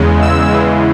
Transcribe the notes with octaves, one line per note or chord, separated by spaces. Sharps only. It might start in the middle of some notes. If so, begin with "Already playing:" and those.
Already playing: E2 C#3 G#3
E6
E2 C#3 E3 G#3